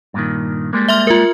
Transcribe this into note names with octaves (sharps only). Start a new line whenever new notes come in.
G2 A#2 D#3
G3 G#3 A#3
E5 C6 F6
F4 A#4